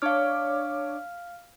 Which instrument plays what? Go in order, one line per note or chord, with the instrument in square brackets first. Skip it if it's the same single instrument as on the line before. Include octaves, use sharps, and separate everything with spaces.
[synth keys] D4 C#5 D6 [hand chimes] F5 F6